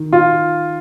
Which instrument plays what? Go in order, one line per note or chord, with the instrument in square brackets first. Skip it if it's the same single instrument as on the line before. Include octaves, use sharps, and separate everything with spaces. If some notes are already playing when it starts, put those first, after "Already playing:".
Already playing: [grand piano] D#3
F4